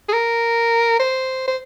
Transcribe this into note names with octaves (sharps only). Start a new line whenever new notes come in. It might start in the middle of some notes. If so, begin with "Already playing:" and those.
G#4
A#4
C5
C5